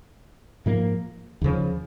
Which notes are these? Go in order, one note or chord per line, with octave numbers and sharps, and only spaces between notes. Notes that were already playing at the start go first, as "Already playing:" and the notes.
G#2 F3 A#3
D#2 C#3 F3